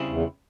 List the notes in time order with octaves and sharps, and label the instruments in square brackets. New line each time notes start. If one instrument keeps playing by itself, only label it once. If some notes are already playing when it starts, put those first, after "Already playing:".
Already playing: [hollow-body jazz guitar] C#3 G3 C4 E4 G#4
[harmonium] E2